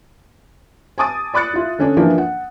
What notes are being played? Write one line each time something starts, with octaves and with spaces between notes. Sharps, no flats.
G#5 A5 D6 D#6 A6
D5 B5 D6 F#6 A6 C#7
E4 F4
D3 C#4 D4
E3 F3 A#3 D4
F#5